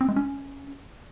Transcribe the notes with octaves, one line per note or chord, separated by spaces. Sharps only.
C4
G#3
C#4